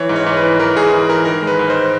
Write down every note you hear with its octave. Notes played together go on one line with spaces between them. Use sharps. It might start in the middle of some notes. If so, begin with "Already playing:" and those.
Already playing: E3 C#5
G#2
C#5
G#2
B4
E3
E3 A#4
G#2 G#4
E3
E3 A#4
D#3 A#4
G#3
B4
G#2
C5